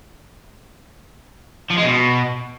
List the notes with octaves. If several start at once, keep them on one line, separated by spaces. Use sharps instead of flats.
F3
G#3
B2